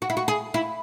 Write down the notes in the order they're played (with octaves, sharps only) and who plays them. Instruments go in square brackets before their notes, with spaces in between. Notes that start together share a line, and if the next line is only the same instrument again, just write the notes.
[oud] F#4
E4
F#4
G#4
E4